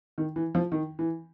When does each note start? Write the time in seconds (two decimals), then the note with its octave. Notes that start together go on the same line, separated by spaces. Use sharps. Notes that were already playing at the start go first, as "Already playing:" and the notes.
0.18 D#3
0.36 E3
0.55 F3
0.72 D#3
0.99 E3